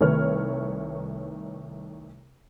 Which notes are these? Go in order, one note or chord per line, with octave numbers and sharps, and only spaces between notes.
C2 D#3 A3 B4 C#5 F6